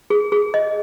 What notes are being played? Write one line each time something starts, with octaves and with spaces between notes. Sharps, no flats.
G#4
G#4
D#5